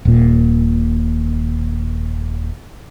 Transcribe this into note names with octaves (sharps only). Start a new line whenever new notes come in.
D#1 A#2